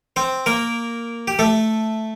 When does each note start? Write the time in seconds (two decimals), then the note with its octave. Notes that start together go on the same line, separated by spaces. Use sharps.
0.16 C4 C5
0.46 A#3 A#4
1.28 G4
1.39 A3 A4